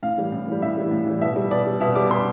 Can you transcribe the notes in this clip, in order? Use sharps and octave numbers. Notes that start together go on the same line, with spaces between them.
A2 F5
E3 G3
A2
E3 G3
A2 E5
E3 G3
A2
E3 G3
B2 E5
G3
B2 D5
G3
B2 E5
G3 D6
B2 C6